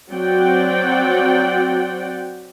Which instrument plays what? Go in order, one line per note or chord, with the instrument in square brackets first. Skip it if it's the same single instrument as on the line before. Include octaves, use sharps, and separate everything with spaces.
[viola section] F#3 C4 F#4 D5 F#5 G5